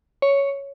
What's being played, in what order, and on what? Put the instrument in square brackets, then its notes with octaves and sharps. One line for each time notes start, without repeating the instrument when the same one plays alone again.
[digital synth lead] C#5